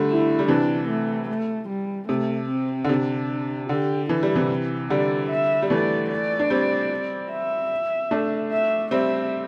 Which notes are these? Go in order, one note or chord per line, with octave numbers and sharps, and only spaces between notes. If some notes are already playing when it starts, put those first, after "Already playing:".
Already playing: D3 G3 A3
E4
G3
C3 E3 D4
A3
A3
G3
C3 A3
C4
D3
C3 D4
D3 G4
E3 E4
G3
C3 E3
D3 G3 D5
E5
G3
E3 A3 D5
D5
D4
G3 C4
E5
A3 D4
E5
G3 C4 E5